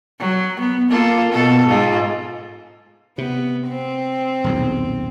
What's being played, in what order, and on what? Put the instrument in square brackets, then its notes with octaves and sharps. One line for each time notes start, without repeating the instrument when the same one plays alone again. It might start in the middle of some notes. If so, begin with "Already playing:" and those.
[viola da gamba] F#3
B3
A#3 F4 A4
B2 A4
G#2 F4
[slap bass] C3 [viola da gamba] B3
[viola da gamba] C4
[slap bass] D#1 B1 E2